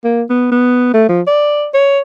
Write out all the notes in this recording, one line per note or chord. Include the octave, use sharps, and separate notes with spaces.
A#3
B3
B3
A3
F3
D5
C#5